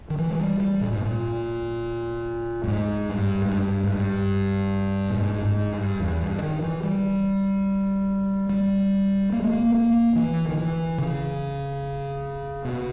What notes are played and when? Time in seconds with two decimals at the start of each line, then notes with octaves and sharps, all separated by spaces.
0.10 D#3
0.18 E3
0.30 G#3
0.40 G3
0.60 G3
0.81 A#2
0.93 G#2
1.05 A#2
2.64 G2
2.68 G#2
3.10 G2
3.42 G#2
3.51 G2
3.84 G#2
3.92 G2
5.10 A#2
5.17 G#2
5.45 G#2
5.72 G2
6.00 E2
6.21 G2
6.42 D#3
6.62 E3
6.83 G3
8.49 G3
9.33 A#3
9.42 G#3
9.52 A#3
9.74 A#3
10.15 E3
10.49 D#3
10.57 E3
10.98 C#3
12.65 B2